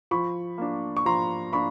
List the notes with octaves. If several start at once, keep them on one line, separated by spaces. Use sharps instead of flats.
F3 B5 C#6
A#3 D4
C#6
F3 A#5 C6
A#3 D4 B5 C#6